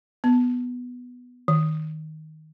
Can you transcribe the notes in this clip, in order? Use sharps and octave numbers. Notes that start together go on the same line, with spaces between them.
B3
D#3